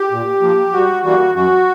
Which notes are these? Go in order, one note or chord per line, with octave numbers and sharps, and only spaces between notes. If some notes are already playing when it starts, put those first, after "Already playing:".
Already playing: G4
A#2
F3 A#3
G2 F#4
E3 G3 A#3 F#4
F#2 F#4